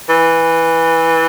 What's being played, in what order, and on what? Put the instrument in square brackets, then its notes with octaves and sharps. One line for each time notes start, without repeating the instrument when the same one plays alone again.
[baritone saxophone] E3